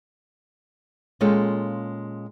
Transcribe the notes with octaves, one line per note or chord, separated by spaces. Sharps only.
A#2 G#3 C#4 F4 A4 G5